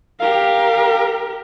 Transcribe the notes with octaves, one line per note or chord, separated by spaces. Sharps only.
G4 A#4 F5